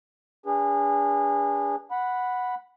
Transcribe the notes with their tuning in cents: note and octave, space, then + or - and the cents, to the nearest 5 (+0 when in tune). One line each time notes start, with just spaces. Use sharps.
D4 -35 G#4 -30 B4 -15
F#5 -5 B5 +0